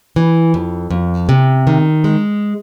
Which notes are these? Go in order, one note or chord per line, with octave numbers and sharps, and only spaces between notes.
E3
F2
F2
C3
D#3
G#3